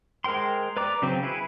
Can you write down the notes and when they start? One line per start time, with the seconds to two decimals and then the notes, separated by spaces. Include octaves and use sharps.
0.24 G#3 A#4 C5 G5 C6
0.77 B4 D5 A#5 D6
1.02 C#3 F#3 C4
1.23 E4 G#4 B4